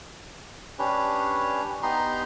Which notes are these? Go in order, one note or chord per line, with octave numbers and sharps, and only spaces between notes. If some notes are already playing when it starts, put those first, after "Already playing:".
C#4 D4 G4 B4 C#5
B3 D#4 G4 A#5 C6